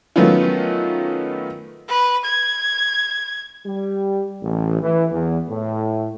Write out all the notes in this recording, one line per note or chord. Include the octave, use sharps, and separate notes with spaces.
D#3 F#3 A3 B3 C#4 F4
B4
G#6
G3
A1
E3
E2
A2